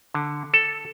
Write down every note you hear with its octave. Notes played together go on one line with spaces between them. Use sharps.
D3
A4